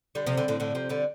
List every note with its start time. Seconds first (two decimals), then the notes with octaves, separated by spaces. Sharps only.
0.15 D3 G3
0.27 C3 F3
0.37 D3 G3
0.48 A2 D3
0.60 A2 D3
0.75 C3 F3
0.89 D3 G3